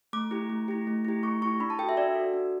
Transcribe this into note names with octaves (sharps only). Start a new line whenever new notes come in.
A3 D6
E4 G4
A3
E4 G4
A3
E4 G4
A3 C#6
E4 G4 C#6
D4 B5
A5
F#4 A4 G5
E5
D4 D5
F#4 A4
D4